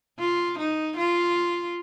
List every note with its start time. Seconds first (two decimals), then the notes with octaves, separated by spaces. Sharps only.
0.19 F4
0.59 D#4
0.97 F4